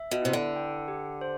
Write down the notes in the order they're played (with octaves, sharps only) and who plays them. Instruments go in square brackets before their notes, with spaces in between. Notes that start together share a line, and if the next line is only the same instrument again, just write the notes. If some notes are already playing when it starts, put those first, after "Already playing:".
Already playing: [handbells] E5
[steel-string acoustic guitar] B2
[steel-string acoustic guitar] C3 [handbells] E4
[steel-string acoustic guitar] D3
[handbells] G5
G4
C5